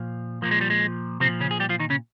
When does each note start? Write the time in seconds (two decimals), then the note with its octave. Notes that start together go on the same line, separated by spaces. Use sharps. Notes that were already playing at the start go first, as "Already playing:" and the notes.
Already playing: A#2 F3
0.42 A#2 F3 A#3
0.51 G#3
0.61 G3
0.70 G#3
1.20 C3 F3 C4
1.24 A#2
1.40 C#3 C#4
1.51 G#4
1.60 G3 G4
1.69 F3 F4
1.80 D#3 D#4
1.90 C#3 C#4